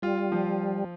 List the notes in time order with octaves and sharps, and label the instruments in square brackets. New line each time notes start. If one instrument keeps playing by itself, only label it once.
[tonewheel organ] G3 [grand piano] F4
[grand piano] F3